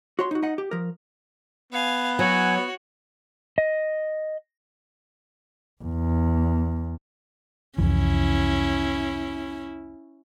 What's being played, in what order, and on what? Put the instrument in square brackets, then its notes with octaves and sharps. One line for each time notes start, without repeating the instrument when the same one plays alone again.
[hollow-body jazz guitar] F#4 C#5 C6
D#4 F#4
D#4 D#5 F#5
G4
F3 A#4
[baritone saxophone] B3 [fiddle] F5 G#5
[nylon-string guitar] F#3 [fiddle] F#4 C#5 [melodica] G#5
[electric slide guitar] D#5
[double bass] E2
[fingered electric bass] C2 F2 E3 [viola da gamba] C#4 E4